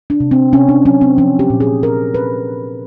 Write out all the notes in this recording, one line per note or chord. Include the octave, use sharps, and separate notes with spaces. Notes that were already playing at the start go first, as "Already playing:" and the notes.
D4
C3
C4
C3 C#4
D4
F#3 C#4
C4
F3 C#4
G4
A#2
G#4
A#2 A#4
B4